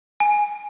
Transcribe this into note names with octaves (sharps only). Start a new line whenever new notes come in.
G#5